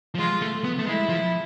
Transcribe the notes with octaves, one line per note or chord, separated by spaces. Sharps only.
F3
G#3 F4
A3
B3
A3
G#3 E4
F3